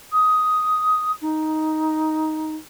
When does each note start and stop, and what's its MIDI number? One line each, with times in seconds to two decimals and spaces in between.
0.12 1.11 87
1.21 2.55 63